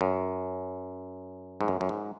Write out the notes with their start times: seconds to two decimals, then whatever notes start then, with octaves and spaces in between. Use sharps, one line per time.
0.01 F#2
1.61 G#2
1.68 F#2
1.81 F#2
1.89 G#2